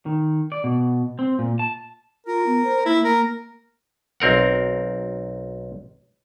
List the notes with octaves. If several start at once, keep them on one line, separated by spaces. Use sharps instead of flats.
D#3
D5
B2
C4
A#2
A5
F4 A#4
B3
C5
A#3 E4
A#3 A#4
B1 C4 A#4 F#5